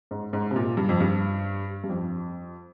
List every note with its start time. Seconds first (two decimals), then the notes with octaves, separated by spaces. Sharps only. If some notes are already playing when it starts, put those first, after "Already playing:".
0.11 G#2
0.33 G#2
0.51 C3
0.56 A#2
0.77 G2
0.89 F2
1.00 G2
1.84 G2
1.89 F2